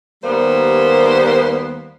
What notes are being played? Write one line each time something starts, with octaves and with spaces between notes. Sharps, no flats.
D#2 G3 A#3 B3 C5